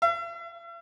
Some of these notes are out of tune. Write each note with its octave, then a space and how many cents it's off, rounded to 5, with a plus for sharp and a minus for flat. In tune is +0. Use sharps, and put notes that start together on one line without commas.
E5 +45